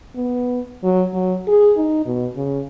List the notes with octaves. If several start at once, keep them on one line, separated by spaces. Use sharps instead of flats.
B3
F#3
F#3
G#4
D#4
B2
C#3